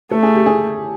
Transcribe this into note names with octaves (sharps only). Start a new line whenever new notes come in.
A3 A4
G#4
G4
G#4